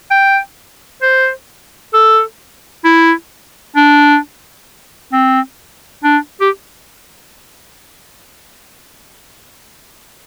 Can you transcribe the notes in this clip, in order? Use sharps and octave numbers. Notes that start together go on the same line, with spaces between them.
G5
C5
A4
E4
D4
C4
D4
G4